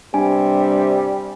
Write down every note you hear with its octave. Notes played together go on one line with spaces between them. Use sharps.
G2 C3 G3 G#5